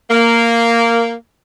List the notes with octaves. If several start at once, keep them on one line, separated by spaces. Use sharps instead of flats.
A#3